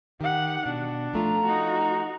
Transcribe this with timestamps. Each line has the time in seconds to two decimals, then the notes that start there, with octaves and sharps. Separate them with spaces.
0.21 D#3 G4 F#5
0.66 B2 D4
1.13 F3 A3 F4 A#5
1.45 D#4 F#4